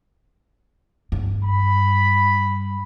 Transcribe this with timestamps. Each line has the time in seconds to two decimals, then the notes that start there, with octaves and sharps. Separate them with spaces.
1.12 G2
1.44 B5